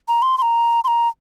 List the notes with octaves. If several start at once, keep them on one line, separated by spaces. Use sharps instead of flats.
A#5
C6
C6
A#5
C6
A#5